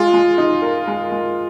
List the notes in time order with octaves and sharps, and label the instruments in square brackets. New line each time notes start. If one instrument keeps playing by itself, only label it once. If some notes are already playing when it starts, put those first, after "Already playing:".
Already playing: [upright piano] G#3 [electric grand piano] F4
[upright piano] G#3
D#4
A#4
G#3
G#3